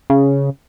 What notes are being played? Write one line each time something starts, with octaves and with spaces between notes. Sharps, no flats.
C#3